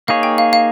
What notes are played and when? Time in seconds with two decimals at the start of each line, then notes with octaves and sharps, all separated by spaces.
0.08 A#3 D#4 G#4 C#5 F5
0.23 G5
0.38 F5
0.53 F5